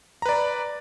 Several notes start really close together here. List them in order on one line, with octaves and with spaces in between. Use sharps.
A#5 B4 D5